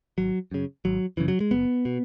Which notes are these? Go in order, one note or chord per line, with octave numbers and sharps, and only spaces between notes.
G#1 F#3
F#2 C#3
G#1 F#3
F#2 C#3 E3
F#3
G#3
F#1 B3
B2